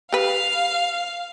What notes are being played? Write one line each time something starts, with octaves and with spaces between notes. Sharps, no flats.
G4 B4 F5